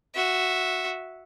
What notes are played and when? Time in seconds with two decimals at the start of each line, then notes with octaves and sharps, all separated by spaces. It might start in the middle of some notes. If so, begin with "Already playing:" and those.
0.15 F#4 E5